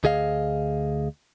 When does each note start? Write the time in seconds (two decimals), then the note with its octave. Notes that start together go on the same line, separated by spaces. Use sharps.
0.04 D2 G#4 D#5 F5